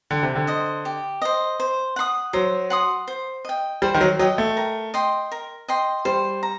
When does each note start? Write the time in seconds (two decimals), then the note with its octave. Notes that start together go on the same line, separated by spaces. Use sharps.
0.11 D3 G4
0.23 C3
0.35 D3
0.47 C5 D#5
0.85 G4
1.22 C5 D#5
1.60 C5
1.96 F#5 C6 D#6
2.33 F#3 C5
2.70 F#5 C6 D#6
3.08 C5
3.45 D#5 G5
3.82 G3 C5
3.94 D#3
4.01 F#3
4.19 F#3 D#5 G5
4.38 A3
4.57 A#4
4.94 D#5 G5 C6
5.32 A#4
5.68 D#5 G5 C6
6.05 G3 C5
6.43 A#5